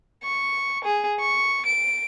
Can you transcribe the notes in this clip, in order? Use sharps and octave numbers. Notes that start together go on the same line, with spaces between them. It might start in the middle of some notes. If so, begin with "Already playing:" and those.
C#6
G#4
C#6
D7